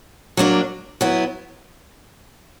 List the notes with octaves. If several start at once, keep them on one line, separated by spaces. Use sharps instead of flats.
F#3 A#3 D4
F#3 B3 E4